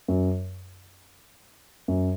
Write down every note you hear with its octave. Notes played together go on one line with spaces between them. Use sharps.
F#2
F#2